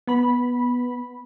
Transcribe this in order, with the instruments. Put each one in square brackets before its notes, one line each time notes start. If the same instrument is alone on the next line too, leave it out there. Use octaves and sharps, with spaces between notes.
[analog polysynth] B3 B5